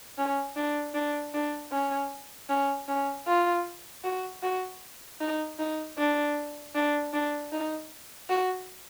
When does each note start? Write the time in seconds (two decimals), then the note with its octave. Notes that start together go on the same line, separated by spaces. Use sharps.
0.18 C#4
0.56 D4
0.94 D4
1.34 D4
1.72 C#4
2.49 C#4
2.88 C#4
3.27 F4
4.04 F#4
4.43 F#4
5.20 D#4
5.59 D#4
5.98 D4
6.75 D4
7.13 D4
7.52 D#4
8.29 F#4